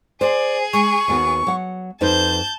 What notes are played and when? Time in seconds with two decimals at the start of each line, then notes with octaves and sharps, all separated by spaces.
0.21 G#4 C5 D5
0.73 G#3 C#6
1.08 D#2 B3 F#4
1.47 F#3 F#5
2.01 F2 D#4 B4 C5 A5 G6